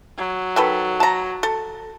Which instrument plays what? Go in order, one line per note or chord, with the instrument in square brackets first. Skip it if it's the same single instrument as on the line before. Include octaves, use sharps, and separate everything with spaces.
[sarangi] F#3
[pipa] D#3 A4 B4
A5 A#5
A4